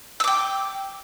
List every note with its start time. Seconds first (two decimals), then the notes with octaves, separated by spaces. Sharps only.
0.20 E6
0.24 D6
0.28 G5